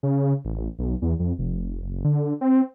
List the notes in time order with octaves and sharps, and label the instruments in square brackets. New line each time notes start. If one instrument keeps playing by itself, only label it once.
[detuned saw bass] C#3
A1
B1
E2
F2
F1
F#1
D3
C4